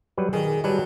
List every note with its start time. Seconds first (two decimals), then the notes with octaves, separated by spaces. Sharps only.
0.17 F#3 G3 B4
0.33 D#3 G#4
0.64 F#3 G3 B4 A5